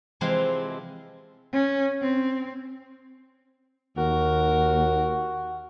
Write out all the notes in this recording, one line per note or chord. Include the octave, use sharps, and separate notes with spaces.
C3 E3 F3 G#3 C4
C#4
C4
D#2 F#4 A#4